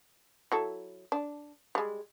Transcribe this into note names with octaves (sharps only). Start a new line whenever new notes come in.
F#3 E4 A4
D4
G3 G#3